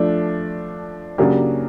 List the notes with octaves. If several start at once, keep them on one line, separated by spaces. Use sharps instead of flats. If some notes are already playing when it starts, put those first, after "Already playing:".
Already playing: F3 A3 D4
C#3 F#3 A#3 D4 G4